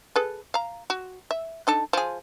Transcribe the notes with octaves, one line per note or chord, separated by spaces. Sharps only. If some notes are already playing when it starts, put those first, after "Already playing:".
G#4 A4 B4
F5 A#5
F#4
E5
D4 D#4 A4
F3 G#4